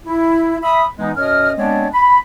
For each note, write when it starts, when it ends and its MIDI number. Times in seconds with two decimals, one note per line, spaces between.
0.06 0.58 64
0.63 0.85 76
0.63 0.85 83
0.63 0.85 87
0.99 1.12 52
0.99 1.12 56
0.99 1.12 59
0.99 1.12 63
1.16 1.52 42
1.16 1.52 47
1.16 1.52 73
1.16 1.52 75
1.16 1.52 89
1.58 1.88 56
1.58 1.88 59
1.58 1.88 60
1.58 1.88 62
1.58 1.88 73
1.58 1.88 74
1.93 2.19 83